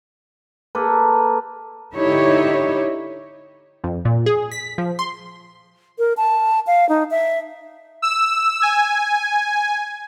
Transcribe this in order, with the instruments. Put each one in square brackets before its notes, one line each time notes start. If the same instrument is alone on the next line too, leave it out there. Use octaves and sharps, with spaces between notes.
[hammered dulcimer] A#3 A4 B4
[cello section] D3 D#4 E4 G4 C#5
[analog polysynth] F2
A#2
G#4
B6
F3
C6
[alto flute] A#4
A5
F5
D#4
E5
[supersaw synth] E6
G#5